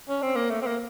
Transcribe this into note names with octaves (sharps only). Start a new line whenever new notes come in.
C#4
C4
A#3
A3
C4
A#3